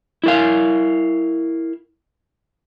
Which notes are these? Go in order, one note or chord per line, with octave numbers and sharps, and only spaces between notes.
E4 A#4 F5